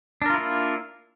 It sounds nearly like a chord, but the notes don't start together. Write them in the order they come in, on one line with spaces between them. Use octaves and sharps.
D4 A#4 F4 E4 A#3